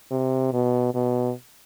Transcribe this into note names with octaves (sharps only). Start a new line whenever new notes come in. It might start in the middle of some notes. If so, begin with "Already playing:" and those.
C3
B2
B2